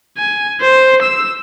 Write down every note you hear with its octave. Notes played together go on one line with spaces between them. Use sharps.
G#5
C5
E6